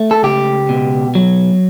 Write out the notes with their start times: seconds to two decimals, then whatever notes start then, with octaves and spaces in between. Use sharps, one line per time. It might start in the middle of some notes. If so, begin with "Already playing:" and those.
Already playing: A3
0.11 A4
0.23 C#2 G4
0.69 B2
1.15 F#3